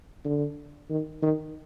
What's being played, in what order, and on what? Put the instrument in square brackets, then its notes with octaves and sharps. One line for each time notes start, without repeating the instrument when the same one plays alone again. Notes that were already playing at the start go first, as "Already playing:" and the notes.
[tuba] D3
D#3
D#3